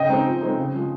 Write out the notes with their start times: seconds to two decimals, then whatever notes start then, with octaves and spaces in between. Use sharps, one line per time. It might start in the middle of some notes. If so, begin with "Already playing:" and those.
Already playing: C#3 D#5 G5
0.09 G#3 C4 D#4
0.26 F3
0.41 G#3 C4 D#4
0.57 C#3
0.73 F3 G#3